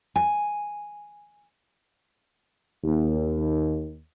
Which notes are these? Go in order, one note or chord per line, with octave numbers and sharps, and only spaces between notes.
G#5
D#2